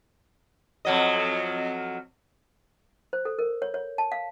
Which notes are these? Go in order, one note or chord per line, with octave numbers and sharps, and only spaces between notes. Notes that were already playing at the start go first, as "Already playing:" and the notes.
F2 F#3 D#5
C5
A4
A#4
C#5
C#5
A5
F5